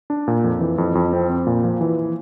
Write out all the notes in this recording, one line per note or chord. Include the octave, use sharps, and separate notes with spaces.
D4
A#2
F2
E3
F2
F2
C4
C4
A#2
F3
E3